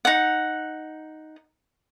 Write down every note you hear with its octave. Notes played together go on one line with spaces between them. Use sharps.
D#4 F#5